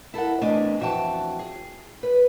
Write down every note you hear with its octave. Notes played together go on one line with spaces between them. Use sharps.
E4 A4 A#4 F#5
E2 C3 A3 D4 D#5 G#5
F2 E3 F#4 E5 G5 A5
G#4
B4